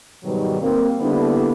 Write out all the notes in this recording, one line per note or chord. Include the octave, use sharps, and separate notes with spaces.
G#2 B2 D#3 F#3 G3
A#3 C4
D3 G3 A#3 B3 D4 E4